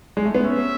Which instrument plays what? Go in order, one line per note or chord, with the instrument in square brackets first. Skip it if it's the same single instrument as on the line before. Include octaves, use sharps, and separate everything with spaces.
[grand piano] G#3
A3
B3
[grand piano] C#4 [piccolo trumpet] E5